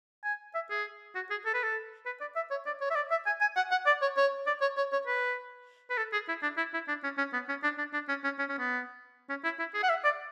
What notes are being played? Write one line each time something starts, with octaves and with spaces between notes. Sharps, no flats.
G#5
E5
G#4
F#4
G#4
A4
B4
A4
B4
D5
E5
C#5
D5
C#5
E5
D5
E5
G#5
G#5
F#5
F#5
D5
C#5
C#5
D5
C#5
C#5
C#5
B4
B4
A4
G#4
E4
D4
E4
E4
D4
C#4
C#4
B3
C#4
D4
D4
D4
C#4
C#4
C#4
C#4
B3
C#4
E4
E4
G#4
F#5
E5
D5